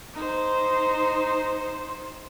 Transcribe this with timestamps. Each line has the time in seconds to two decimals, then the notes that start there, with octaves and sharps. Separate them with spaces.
0.14 D#4 C5